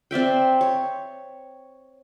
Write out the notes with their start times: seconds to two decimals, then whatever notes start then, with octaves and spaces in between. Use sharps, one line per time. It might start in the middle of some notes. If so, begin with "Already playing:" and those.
0.11 C4 D5 E5 G5
0.61 C#5